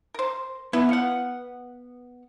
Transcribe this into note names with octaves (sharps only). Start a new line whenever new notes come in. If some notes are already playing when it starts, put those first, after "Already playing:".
A#4 C5
D3 B3 E4
F5 F#5